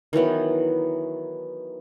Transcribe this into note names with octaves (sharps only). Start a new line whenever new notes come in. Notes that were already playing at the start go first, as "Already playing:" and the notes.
D#3 E3 F#3 B3